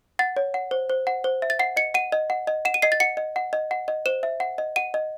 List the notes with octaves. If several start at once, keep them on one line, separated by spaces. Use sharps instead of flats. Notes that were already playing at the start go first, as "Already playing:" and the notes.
F#5 A6
C#5
F#5
C5
C5
F#5
C5
E5
A6
F#5 C7
D#5 C#7
F#5 D#7
D#5
F#5
D#5
F#5 E7
D#7
D#5 C7
A6
F#5 C#7
D#5
F#5
D#5
F#5
D#5
C5 E7
E5
F#5
D#5
F#5 D#7
D#5